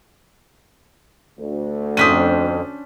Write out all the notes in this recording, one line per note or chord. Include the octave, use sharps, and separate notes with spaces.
D2
F2 C#4 D4 C5 D#6 B6 D#7